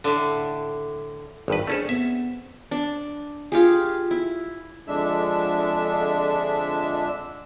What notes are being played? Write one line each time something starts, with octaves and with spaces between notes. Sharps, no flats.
A2 D3
G#1 G2 B4
A3 C#4 D4 G#4 A4 C5
B3 C4 E5
D4
F4 G4 G#4
E4
F2 D3 G#3 D4 E5 E6